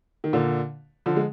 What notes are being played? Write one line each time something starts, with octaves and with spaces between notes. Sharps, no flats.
D#3
A#2 D3
D3 F3
G#3